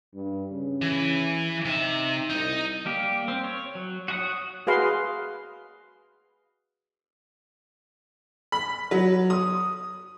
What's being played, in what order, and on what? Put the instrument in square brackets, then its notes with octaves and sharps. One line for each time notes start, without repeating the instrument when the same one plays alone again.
[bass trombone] G2
C#3
[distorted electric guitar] E3
[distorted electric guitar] C3 E5 [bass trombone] D#4
[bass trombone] C2 [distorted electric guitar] D#4
[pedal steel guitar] G3 A#3 G4
C4
C#5
F#3
F#4 C#5 F#5 D#6
[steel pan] F#4 G#4 B4 F5 C6
[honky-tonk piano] B5
F#3
D#6